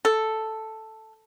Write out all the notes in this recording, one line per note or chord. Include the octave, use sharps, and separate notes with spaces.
A4